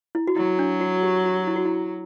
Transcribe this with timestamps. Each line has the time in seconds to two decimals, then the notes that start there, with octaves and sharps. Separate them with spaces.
0.15 E4
0.27 F#4
0.36 F#3 E4
0.59 D4
0.81 F#4
1.03 G4
1.25 F#4
1.47 E4
1.56 F#4
1.65 E4